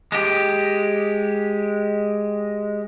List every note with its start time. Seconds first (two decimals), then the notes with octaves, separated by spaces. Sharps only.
0.12 G#3 G4